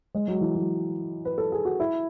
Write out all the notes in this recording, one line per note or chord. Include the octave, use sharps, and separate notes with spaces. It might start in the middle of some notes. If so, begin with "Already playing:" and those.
G#3
F#3
E3
F#3
B4
A4
G#4
F#4
E4